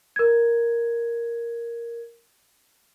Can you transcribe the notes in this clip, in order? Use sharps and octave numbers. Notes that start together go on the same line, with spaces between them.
A#4 G#6